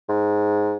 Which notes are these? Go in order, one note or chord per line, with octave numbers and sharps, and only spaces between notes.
G#2